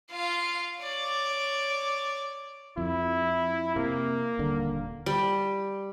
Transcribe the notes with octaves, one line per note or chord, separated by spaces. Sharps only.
F4 F5
C#5 D5
F2 E4
C3 A#3
D#1 D3
G3